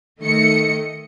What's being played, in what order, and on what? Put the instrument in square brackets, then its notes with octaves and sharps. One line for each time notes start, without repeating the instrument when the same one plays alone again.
[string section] D#3 A3 D#5 C#7